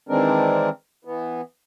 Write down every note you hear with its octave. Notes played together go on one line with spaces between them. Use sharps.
D#3 E3 G#3 C4 D4 A#4
E3 B3